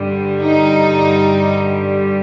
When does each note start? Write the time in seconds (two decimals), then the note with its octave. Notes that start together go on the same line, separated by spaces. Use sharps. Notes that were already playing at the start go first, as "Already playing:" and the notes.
Already playing: G2 D3 G3
0.40 D#4